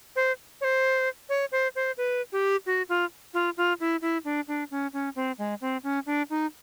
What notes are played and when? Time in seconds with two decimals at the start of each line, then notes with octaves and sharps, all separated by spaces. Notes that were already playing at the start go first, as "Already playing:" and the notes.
0.16 C5
0.61 C#5
0.64 C5
1.29 C#5
1.52 C5
1.76 C5
1.98 B4
2.32 G4
2.66 F#4
2.89 F4
3.34 F4
3.57 F4
3.80 E4
4.02 E4
4.25 D4
4.48 D4
4.71 C#4
4.93 C#4
5.16 C4
5.38 G#3
5.61 C4
5.84 C#4
6.06 D4
6.30 D#4